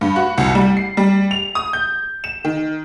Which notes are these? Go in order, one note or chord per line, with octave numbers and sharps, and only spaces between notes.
G2
F#4
C2
G3
C7
G3
F7
D#6
G6
E7
D#3